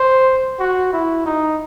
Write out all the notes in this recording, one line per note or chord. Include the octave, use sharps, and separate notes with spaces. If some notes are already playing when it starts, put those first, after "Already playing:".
Already playing: C5
F#4
E4
D#4